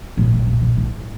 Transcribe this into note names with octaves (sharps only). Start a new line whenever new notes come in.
A2
A2
A#2
A#2
A2